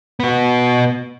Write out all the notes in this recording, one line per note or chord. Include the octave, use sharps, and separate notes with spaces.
B3 F#4